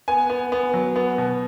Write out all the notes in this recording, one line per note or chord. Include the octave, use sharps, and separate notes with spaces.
B3 G#5
B3
B3
F#3
B3
B2